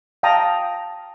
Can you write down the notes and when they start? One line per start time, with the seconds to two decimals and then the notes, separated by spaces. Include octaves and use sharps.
0.23 F5 G5 A5 A#5 D#6